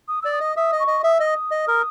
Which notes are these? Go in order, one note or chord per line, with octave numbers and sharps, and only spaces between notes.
D#6
D5 E6
D#6
D#5
E5 D#6
D#5
C#6
D#5
E5 D#6
E6
D#5
D#6
D#5
A#4